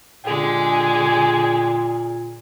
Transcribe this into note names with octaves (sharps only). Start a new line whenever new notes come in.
A#2 D3 G#3 G4 G#4